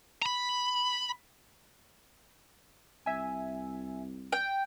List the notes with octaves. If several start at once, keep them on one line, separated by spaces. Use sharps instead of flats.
A#5 B5
C2 E5 G#5
G5